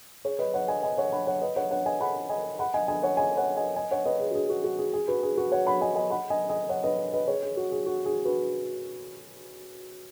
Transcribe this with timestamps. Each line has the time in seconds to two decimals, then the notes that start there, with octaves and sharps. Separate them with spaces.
0.25 G#4 C#5
0.39 B4 D#5
0.54 C#5 F#5
0.68 D#5 G#5
0.83 D#5 G#5
0.97 C#5 F#5
1.12 F#5 B5
1.27 C#5 F#5
1.42 B4 D#5
1.56 C#5 F#5
1.71 C#5 F#5
1.86 D#5 G#5
2.00 F#5 B5
2.29 D#5 G#5
2.59 F#5 B5
2.74 D#5 G#5
2.88 D#5 G#5
3.03 C#5 F#5
3.17 D#5 G#5
3.37 C#5 F#5
3.57 D#5 G#5
3.76 D#5 G#5
3.91 C#5 F#5
4.06 B4 D#5
4.20 G#4
4.31 F#4
4.35 G#4
4.49 F#4
4.64 F#4
4.79 G#4
4.93 G#4
5.08 F#4 B4
5.23 G#4
5.37 F#4 B4
5.52 C#5 F#5
5.66 F#5 B5
5.81 D#5 G#5
5.96 D#5 G#5
6.10 F#5 B5
6.30 D#5 G#5
6.50 D#5 G#5
6.69 C#5 F#5
6.84 B4 D#5
7.13 B4 D#5
7.28 G#4 C#5
7.43 G#4
7.57 F#4
7.72 G#4
7.86 F#4
8.06 G#4
8.25 F#4 B4